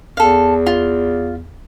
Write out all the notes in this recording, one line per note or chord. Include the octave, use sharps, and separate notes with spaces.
E2 A4 F5
F4